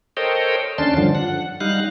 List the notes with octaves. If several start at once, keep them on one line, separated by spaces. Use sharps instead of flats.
A4 A#4 C5 C#5 D#5 G5
D#2 C#4 D4 A5 C6
G2 D3 F3
F#5
G3 D#4 F5 F#6